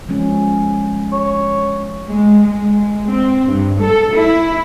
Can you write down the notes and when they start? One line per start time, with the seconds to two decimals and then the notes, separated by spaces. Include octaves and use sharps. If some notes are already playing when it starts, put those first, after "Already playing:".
0.09 F3 G#3 C#4
1.12 C#5
2.08 G#3
2.42 G#3
3.09 C4
3.47 G2
3.80 A4
4.16 E4